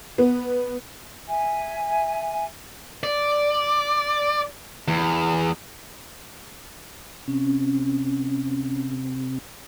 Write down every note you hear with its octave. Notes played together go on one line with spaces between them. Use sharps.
B3
E5 G#5
D5
E2
C3 C#4